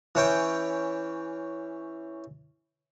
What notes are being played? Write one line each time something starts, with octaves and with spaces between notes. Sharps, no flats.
E3 C#4 G5